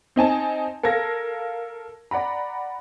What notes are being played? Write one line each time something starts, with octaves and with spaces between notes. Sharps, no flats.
C4 D#4 G#5 A5
A4 A#4 F5 G#6 A#6
D5 F#5 A#5 B5